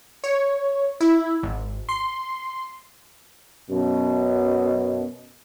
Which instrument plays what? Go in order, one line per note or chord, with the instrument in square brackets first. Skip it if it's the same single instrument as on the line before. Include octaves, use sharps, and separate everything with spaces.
[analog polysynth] C#5
E4
G#1
C6
[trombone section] F#2 B2